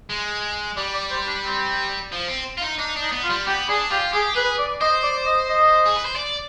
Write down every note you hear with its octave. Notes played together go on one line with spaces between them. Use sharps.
G#3
G3 D5
D5
C5
D4
C4
F3
C4
F4
D#4
D4 D#4
D4 D#4
B3
F4
G3
B3 G4
D4 G#4
F4 G4
G4 G#4
G#4 B4
D5
C5 D#5
D5
D#5
D#5
G#4
B4
C5
D5